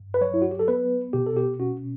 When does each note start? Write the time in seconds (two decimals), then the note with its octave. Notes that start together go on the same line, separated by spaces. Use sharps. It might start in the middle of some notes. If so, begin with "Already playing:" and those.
Already playing: G2
0.14 B4
0.21 F#3 C#5
0.34 E4
0.42 F#4
0.51 G4
0.59 A4
0.68 B3 B4
1.13 B2 G4
1.27 A4
1.37 G4
1.60 C#4 F#4